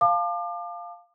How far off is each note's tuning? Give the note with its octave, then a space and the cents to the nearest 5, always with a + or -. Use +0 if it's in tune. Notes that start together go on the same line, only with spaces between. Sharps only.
F5 +0 A5 +0 D6 +35